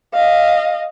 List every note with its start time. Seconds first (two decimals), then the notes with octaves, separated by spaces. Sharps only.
0.13 D#5 F5